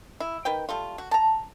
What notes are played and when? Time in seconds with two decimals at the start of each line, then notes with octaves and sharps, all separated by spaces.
0.20 E4
0.45 D#3 B4 G5
0.69 G3 A3 F4
0.98 F#4
1.11 A5 A#5